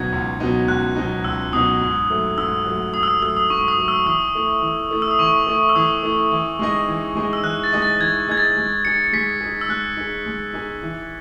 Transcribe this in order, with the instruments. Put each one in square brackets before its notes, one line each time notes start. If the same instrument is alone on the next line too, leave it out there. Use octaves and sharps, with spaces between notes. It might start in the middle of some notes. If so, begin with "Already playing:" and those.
Already playing: [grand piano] C#2 B2 F#3 B3 D#4 [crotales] G#6
[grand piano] C#2
B2 F#3 B3 D#4
[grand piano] C#2 [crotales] F#6
[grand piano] B2 F#3 B3 D#4
[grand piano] C#2 [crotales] E6
[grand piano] B2 F#3 B3 D#4 [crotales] D#6
[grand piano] G#2
F#3 A3
[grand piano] G#2 [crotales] E6
[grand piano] F#3 A3
[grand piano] G#2 [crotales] D#6
[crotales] E6
D#6
[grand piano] F#3 A3 [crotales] E6
[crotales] D#6
[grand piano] G#2 [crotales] C#6
[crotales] D#6
[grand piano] F#3 A3
[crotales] E6
[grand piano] E3 [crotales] D#6
[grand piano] A3 E4
E3
A3 E4
[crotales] E6
D#6
[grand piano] E3 [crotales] C#6
[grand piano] A3 E4
[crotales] E6
[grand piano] E3 [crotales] D#6
[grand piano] A3 E4
E3
G#3 D#4 G#4 D#5
E3
G#3 D#4 G#4 D#5
[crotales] E6
[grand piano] E3 [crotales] F#6
[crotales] A6
[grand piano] G#3 D#4 G#4 D#5
[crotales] A6
[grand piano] E3 [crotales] G#6
[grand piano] G#3 D#4 G#4 D#5 [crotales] G#6
[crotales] A6
[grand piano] G#3
[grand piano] D#4 G#4 [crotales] C#7
[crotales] C#7
[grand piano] G#3 [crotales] B6
[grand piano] G#4
D#4
[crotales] E6
[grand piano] G#3 [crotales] F#6
[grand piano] D#4 G#4
G#3
D#4 G#4
E3